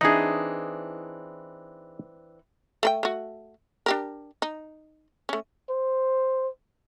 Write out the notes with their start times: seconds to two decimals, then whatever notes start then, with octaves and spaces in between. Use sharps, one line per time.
0.01 E3 C4 D4 D#4 G#4
2.83 A3 A4 G5
3.03 A3 F#4
3.86 D4 G4 A#4
4.42 D#4
5.29 A3 C#4
5.69 C5